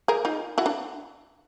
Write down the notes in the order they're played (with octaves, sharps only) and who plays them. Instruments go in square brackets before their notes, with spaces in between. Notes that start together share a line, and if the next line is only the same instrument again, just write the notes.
[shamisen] G#4 A#4
D#4 F4
E4 F#4
D4